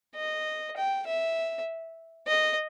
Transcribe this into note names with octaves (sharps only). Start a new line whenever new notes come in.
D#5
G5
E5
D#5